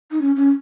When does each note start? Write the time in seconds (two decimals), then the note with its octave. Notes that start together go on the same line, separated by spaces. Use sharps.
0.11 D#4
0.21 C#4
0.36 C#4